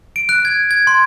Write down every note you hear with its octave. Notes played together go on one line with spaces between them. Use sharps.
D7
F#6
G#6
G#6
C6